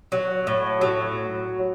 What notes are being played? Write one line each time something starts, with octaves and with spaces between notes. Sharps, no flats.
F#3
A2
F#3